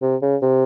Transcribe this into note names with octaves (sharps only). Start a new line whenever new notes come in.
C3
C#3
C3